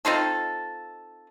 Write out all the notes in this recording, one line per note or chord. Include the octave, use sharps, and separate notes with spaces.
C4 D#4 F4 A4